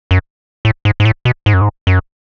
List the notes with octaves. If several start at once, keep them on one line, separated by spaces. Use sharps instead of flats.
F#2
A2
G#2
G#2
A2
B2
G#2
F#2
G#2
F#2